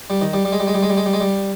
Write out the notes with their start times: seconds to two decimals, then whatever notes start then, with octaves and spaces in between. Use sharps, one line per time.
0.10 G3
0.21 D#3
0.33 G3
0.45 G3
0.53 G#3
0.60 G3
0.67 G#3
0.74 G3
0.83 G#3
0.90 G3
0.97 G#3
1.06 G3
1.13 G#3
1.21 G3